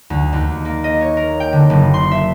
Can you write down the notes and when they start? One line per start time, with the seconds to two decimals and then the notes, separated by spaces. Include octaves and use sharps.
0.10 D2
0.33 D#2
0.65 A#3
0.84 D#5
1.01 C#5
1.17 A#4
1.40 G5
1.53 D3
1.70 F#1
1.94 C6
2.11 E5